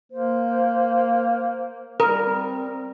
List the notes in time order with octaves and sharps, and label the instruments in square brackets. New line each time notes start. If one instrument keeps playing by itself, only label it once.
[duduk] A#3 [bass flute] C5
[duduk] G3 [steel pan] A#4
[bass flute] C4